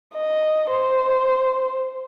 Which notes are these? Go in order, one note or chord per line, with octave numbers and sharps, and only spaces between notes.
D#5
C5